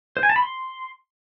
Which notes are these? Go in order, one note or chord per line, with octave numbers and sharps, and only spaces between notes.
C5
G#5
A5
B5
C6